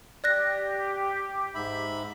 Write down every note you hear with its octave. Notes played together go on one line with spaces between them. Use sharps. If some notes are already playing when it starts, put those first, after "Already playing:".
G4 D5 F#6 A#6
G#2 E5 B5